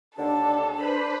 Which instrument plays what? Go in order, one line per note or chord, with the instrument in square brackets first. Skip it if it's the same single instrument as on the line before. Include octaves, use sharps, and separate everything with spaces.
[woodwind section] D#2 D3 [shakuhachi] D4 [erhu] A4
[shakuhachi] D4 [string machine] B4 C5 B5